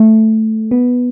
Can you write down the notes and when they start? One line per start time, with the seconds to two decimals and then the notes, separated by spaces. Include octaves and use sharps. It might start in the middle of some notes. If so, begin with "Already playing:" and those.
Already playing: A3
0.71 B3